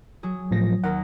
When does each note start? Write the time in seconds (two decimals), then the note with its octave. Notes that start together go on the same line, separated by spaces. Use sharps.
0.23 F#3 G#4
0.51 A2 F3 A#6
0.84 D#2 A#4 F#5